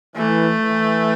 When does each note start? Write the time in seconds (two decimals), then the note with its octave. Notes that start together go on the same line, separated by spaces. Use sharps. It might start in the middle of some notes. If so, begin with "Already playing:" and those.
0.16 E3 A3
0.60 E3